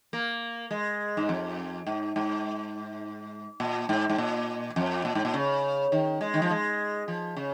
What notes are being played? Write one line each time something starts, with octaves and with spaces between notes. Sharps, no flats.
A#3
G#3
G#2
F2
G#2
G#2
A#2
G#2
G#2
A#2
F2
A#2
G#2
A#2
C#3
D#3
G#3
D#3
F3
G#3
F3
C#3